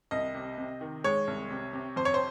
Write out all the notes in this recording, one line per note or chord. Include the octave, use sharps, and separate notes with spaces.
C2 D#5
C3
C3
D#3
G#3 C#5
C2
C3
C3
F2 C5
C#5
C5